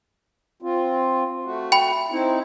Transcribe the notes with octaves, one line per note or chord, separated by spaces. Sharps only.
C4 F4
A3 F#4
G5 B5
C4 D#4 E4